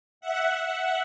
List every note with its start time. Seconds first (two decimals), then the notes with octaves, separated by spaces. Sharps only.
0.21 E5 F#5
0.49 E5 F#5